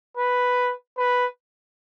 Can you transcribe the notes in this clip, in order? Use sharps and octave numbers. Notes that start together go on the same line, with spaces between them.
B4
B4